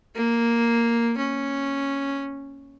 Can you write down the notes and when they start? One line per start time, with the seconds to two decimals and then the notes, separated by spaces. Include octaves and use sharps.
0.15 A#3
1.17 C#4